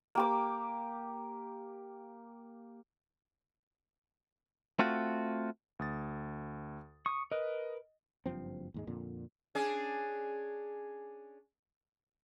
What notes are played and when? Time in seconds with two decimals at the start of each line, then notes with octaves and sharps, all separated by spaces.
0.15 A#3 G4 D6
4.79 A3 C4 F4 F#4
5.79 D2 D#6 A6
7.06 C#6 D#6
7.32 A#4 B4 D#5
8.26 F#1 G2 F3 C4
8.74 D#2 G#2 G#3
8.87 F2 A#2 D3
9.55 C#4 D4 G#4